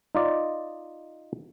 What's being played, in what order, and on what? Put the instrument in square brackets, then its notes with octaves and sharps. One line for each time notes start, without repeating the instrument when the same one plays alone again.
[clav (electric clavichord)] D#4 F4 D5 D#5